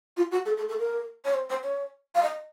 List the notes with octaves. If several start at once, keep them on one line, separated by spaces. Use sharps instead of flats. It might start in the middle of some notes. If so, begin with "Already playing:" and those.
F4
F#4
A4
A4
A4
A#4
C#5
C5
C5
C#5
F5
D#5